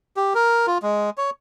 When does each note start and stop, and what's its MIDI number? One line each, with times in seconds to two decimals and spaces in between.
0.17 0.33 67
0.35 0.66 70
0.67 0.78 65
0.83 1.10 56
1.18 1.30 73